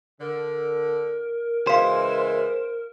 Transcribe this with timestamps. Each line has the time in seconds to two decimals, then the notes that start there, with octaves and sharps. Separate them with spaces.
0.21 D3 A#4
1.67 C#3 E3 G#3 F#4 C5 F5